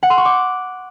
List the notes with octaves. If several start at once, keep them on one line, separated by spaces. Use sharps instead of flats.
F#5
C6
C#6
D6